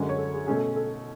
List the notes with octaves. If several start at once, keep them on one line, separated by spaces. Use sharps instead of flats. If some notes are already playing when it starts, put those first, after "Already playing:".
Already playing: F#2 D3 G#3 C#4
C#5
A4
G#4
B2 A3 C#4 G#4
A4
A4